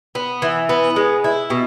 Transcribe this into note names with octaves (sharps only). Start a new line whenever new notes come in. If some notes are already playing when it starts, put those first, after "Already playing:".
B3
E3
B3
G#3
E4
B2